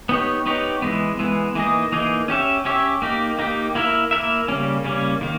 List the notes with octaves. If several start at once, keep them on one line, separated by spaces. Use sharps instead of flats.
B3 D#4 G4 C#5
B3 D#4 G4 C#5
E3 G#3 B3
E3 G#3 B3
E3 A#3 D#4 G#4 D#5
E3 A#3 D#4 G#4 D#5
C#4 G4 C#5 E5
C#4 G4 C#5 E5
A#3 D#4 G4
A#3 D#4 G4
A#3 E4 A#4 E5
A#3 E4 A#4 E5
C#3 G3 A#3 C#4
C#3 G3 A#3 C#4
D#3 A#3